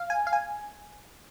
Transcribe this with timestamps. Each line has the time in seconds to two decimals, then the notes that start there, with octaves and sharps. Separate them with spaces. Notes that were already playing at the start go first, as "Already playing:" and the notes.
Already playing: F5
0.10 G#5
0.27 F5
0.33 G#5